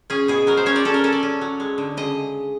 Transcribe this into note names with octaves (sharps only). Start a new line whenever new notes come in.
C#4 G#4
B2 G#4
F#3 A#4
C5
C#4 C#5
D5
C#4 A4
A#4
C#4 A4
D5
C#4
F#3
G#3
D3
C#3 D#5